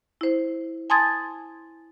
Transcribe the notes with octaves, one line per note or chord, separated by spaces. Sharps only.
E4 C5
G#5 A5 C6 D#6 G#6 A6